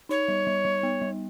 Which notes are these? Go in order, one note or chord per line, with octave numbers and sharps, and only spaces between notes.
D#4 C#5
G3
G3
G3
B3
G3